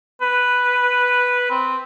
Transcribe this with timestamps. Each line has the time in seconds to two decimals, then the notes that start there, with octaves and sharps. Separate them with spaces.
0.22 B4
1.51 C4